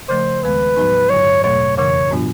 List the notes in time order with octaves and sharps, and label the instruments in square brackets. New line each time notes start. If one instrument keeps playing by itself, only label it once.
[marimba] C#3 F3 A3 [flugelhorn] C5
[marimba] D#2 D#3 G#3 B3 [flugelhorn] B4
[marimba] A2 F#3 B3 D#4
[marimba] G2 D3 F#3 [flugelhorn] C#5
[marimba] E2 B2 F#3 A3 [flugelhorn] C#5
[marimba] F2 C#3 E3 [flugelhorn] C#5
[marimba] A2 F#3 B3 D4 F4